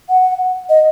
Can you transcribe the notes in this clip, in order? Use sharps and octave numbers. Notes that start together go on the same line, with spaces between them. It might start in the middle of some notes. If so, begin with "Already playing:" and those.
F#5
D#5